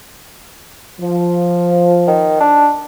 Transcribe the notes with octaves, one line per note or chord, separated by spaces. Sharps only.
F3
D#3
D4